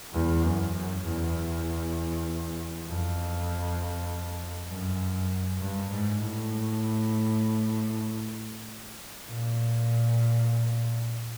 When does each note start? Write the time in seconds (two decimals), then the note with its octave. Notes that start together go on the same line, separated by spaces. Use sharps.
0.13 E2
0.43 F#2
0.73 F#2
1.04 E2
2.86 F2
4.69 F#2
5.60 G2
5.91 G#2
6.21 A2
9.26 A#2